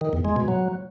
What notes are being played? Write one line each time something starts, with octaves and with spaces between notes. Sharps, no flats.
D#3
E2
G#3
B2
F#3